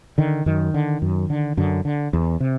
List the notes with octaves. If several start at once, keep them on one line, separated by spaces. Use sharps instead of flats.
D3 D#3
F#2 D#3
D3
F#2
D3
F#2 D3
D3
E2
C3